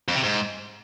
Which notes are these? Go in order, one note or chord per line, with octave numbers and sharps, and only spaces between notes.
F2
C3
G#2